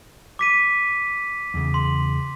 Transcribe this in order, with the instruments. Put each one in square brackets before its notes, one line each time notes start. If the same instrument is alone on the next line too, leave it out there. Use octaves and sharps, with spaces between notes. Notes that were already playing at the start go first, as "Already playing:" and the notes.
[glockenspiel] D6 B6 D#7
[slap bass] E2 C#3
[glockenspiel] C6